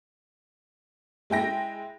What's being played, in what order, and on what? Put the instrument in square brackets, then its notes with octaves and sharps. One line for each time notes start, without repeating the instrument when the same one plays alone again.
[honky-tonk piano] G#3 E4 G5 A#6